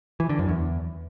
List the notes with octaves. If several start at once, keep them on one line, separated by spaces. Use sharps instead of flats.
E3
D3
F#2
E2